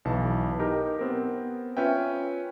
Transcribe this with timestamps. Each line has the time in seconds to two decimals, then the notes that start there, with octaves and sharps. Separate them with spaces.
0.05 B1 E3 A5
0.59 D#4 G4 A#4
0.99 B3 C4 A#4
1.77 C#4 F4 B4 E5 G5